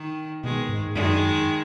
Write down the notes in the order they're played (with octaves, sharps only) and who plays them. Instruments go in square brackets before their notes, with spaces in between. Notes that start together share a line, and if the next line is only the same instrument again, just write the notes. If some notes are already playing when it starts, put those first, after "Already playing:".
Already playing: [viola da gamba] D#3
[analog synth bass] B2 [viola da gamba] D#3 G#3
[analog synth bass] G#2
[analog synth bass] F#2 [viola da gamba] D#3 G#3